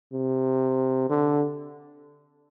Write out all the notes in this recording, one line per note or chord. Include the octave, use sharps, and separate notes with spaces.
C3
D3